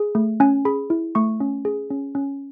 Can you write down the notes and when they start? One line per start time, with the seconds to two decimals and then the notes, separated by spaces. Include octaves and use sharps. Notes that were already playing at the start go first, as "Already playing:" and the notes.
Already playing: G#4
0.15 A3
0.40 C#4 G#5
0.65 G#4 B5
0.90 E4
1.15 A3 C#6
1.40 C#4
1.65 G#4
1.90 C#4
2.15 C#4